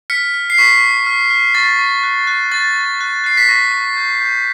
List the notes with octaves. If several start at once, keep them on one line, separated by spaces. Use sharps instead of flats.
F6 B6 C#7
F6
C7
C#6 B6
C#6
F6
F6
C#6 A6
C#6
F#6
F#6
C#6 A6
C#6
F#6
F#6 C7
B6
C#6 A#6
C#6
G6
G6